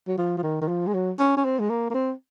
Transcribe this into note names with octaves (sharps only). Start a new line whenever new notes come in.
F#3
F3
F3
D#3
D#3
F3
G#3
F#3
C#4
C#4
C4
G#3
A#3
A#3
C4